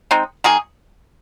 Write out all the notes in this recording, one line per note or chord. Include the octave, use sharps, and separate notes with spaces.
G#3 C4 D#4
D#3 A#3 G#4